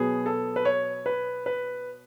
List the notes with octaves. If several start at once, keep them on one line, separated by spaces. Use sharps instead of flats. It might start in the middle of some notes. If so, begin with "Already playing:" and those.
Already playing: B2 F#3 B3 G#4
A4
B4
C#5
B4
B4